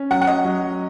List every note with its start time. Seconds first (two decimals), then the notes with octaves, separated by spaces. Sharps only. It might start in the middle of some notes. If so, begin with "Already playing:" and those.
Already playing: C#4
0.11 F#3 F#5
0.22 F#5
0.27 D#5
0.45 F#3